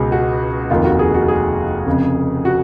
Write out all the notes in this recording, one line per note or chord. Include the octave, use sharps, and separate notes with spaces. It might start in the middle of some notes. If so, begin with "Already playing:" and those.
Already playing: C#2 B2 G#4
F#4
F1 D#2 D#3 F4
F#4
G#4
F#4
G#4
F1 F2 C#3
F#4